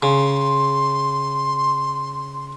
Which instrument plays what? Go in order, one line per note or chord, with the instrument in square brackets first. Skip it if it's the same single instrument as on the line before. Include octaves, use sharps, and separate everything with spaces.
[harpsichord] C#3 [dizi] C6